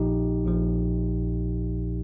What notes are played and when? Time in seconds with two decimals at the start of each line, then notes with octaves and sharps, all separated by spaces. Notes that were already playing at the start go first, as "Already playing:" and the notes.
Already playing: A#1 A#2 F3 D#4 G4
0.45 A#1 A#2 F3